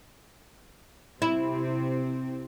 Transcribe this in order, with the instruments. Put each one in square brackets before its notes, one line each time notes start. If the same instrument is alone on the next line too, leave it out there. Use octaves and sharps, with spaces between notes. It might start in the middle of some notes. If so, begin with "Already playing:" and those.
[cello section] C3 C4 [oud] E4